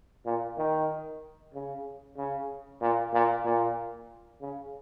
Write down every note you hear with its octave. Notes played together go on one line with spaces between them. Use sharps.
A#2
D#3
C#3
C#3
A#2
A#2
A#2
C#3